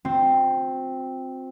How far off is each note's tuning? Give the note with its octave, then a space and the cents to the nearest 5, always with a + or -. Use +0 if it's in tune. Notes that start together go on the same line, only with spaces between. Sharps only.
C4 +0 F4 +45